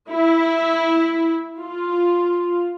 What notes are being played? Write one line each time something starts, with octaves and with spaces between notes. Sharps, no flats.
E4
F4